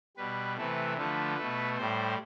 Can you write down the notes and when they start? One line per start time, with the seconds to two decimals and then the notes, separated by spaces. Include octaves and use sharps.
0.17 B2 G3 B4
0.57 C3 E3 A3 B4
0.97 D3 F3 A3 B4
1.38 B2 A3
1.78 A2 G3 C5